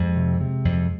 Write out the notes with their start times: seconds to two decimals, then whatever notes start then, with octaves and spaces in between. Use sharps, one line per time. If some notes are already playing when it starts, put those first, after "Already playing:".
Already playing: F2 G#3
0.16 C3
0.40 C3
0.65 F2